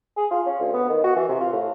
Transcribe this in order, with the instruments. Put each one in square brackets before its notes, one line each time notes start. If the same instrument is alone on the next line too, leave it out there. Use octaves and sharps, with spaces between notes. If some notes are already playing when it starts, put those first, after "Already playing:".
[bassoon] G#4
F4
C#4
D2
B3
D#3
F#4
E3
C3
F4
A2